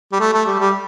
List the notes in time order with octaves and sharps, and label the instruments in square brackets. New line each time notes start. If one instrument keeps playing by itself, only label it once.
[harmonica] G3
A3
A3
G3
G3